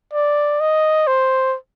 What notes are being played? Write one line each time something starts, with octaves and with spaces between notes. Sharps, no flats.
D5
D#5
C5